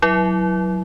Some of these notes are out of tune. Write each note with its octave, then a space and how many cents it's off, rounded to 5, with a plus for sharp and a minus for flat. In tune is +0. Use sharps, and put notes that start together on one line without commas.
F#3 +0 E4 +0 E5 +0